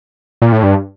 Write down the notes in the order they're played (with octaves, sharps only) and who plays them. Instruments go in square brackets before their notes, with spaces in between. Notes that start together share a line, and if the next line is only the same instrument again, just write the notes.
[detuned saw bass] A#2
A2
G2